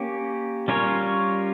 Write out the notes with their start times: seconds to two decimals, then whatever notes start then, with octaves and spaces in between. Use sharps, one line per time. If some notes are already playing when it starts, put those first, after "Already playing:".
Already playing: A#3 C#4 G4
0.68 G3 C#4 F4 A#4 C#5